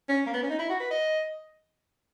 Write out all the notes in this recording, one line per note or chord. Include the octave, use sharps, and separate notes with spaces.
C#4
A#3
B3
C#4
D#4
E4
F#4
B4
D#5